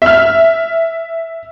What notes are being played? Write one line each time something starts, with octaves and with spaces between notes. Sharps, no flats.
E5 F6